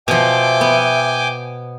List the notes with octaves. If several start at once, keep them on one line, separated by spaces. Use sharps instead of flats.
B2 F3 E5 G5 G#5 D6
B3